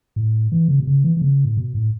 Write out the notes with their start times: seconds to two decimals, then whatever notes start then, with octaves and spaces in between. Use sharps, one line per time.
0.16 A2
0.52 E3
0.68 C#3
0.80 B2
0.87 C#3
1.04 E3
1.17 E3
1.22 C#3
1.45 A2
1.57 B2
1.75 A2